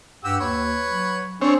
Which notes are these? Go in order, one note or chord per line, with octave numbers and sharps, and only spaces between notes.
G2 F#4 G4 E6
D#2 B4 C#5
F#3
C4 D4 G#4 C#5